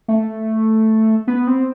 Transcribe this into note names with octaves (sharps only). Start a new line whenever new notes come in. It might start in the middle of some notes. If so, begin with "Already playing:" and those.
A3
B3
C4